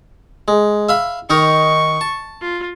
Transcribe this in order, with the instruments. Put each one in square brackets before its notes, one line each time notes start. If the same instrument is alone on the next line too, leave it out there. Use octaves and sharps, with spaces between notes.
[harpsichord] G#3
E5 F5 B5
[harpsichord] D#3 D#4 A#4 [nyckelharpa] C#6
[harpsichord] A5
[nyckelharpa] F4